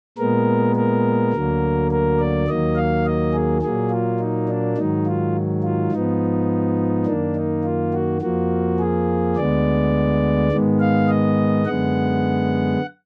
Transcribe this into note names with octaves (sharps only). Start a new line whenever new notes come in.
A#2 G#3 B3 A#4
A#4
D2 D3 F#3 A#3
A#4
D5
D#2 D#3 F#3 A#3 D#5
F5
D#5
G#4
A#2 F#3 A#3 G#4
F4
D#4
D4
G#2 D#3 F#3 D#4
F4
F4
G#2 F3 B3 D#4
F#2 D#3 A#3 D4
D#4
F4
F#4
F2 F3 A#3 F#4
G#4
D2 D3 G#3 B3 D5
G#2 D#3 G#3 B3
F5
D#5
F#2 D3 G#3 B3 F#5